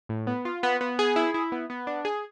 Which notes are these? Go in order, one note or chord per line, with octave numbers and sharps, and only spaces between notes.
A2
B3
F4
B3
B3
G#4
E4
E4
B3
B3
D4
G#4